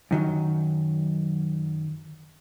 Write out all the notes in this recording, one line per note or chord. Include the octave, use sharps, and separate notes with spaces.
F#2 D#3 F#3